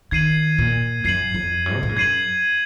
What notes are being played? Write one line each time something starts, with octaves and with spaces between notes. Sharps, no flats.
D#3 G#6 C7 D#7 F#7
A#2
F#2 G#6 C7 D#7 F#7
F2
F#2
C3
A#2
G#2
F#2 G#6 C7 D#7 F#7